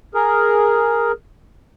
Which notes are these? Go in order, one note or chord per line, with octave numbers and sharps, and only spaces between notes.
G#4 A#4